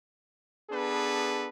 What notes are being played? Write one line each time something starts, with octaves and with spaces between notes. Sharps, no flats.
B3 D4 G#4 A4 B4